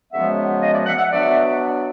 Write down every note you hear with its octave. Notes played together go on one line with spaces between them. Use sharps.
F#2 C#3 F3 G#3 B3 E5 F#5
D#5 F5
D5 E5
E5 F#5
E5 F#5
B2 F#3 B3 D4 D5 E5